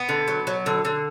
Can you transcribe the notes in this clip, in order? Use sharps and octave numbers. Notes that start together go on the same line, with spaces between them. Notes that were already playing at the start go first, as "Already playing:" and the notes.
Already playing: B3
D3
F#3
F#3
D3
D3